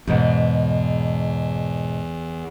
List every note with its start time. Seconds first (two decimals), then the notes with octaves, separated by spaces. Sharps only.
0.08 E2 G#2 B2